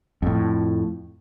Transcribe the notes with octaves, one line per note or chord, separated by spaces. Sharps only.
F2 A2